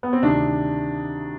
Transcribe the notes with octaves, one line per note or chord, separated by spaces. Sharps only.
B3
C4
D2 C3 D#3 D4